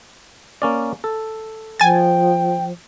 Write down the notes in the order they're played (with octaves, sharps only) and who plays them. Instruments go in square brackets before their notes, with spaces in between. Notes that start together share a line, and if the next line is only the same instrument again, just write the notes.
[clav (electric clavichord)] A#3 C#4 D5
A4
[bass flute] F3 [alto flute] G5 [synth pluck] G#5 A6